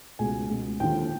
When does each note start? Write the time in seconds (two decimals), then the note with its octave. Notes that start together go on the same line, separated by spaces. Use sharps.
0.19 C#2 B2 G#3 G#5
0.50 C#2 B2 G#3
0.80 D#2 D3 F3 G5